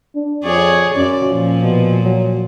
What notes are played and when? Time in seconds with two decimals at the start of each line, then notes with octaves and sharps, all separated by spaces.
0.15 D4
0.44 F2 G#4 C#5 D5
0.95 F#2 C#4 D5
1.27 A#2 F3
1.62 B2
2.04 F#3